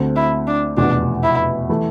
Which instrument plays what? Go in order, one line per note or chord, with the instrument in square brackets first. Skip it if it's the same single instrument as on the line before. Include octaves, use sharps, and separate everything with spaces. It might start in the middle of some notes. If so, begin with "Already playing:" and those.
Already playing: [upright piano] D2 D3 A3 C4
[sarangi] E4
D4
[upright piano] F1 E2 B2 [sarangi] D4
[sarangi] E4
[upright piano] E3 A3 E4